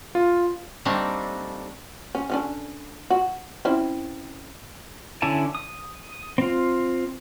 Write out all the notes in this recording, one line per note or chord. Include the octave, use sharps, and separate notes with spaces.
F4
G3 A3 A#3 C4 D4 D#4
C#4
D3 C#4 D4
F#4
C4 C#4 E4
D3 C#4 E4 G#5 A5
D#6
C4 F4